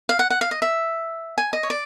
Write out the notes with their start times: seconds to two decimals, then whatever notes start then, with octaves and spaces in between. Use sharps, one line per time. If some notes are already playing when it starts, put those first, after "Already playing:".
0.09 F5
0.19 F#5
0.30 F#5
0.41 F5
0.51 D#5
0.62 E5
1.38 G#5
1.53 D#5
1.63 C#5
1.70 D5